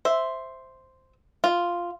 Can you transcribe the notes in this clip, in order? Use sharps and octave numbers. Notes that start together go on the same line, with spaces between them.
C5 E5
F4